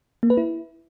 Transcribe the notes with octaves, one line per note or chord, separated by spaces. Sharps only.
A#3
B4
E4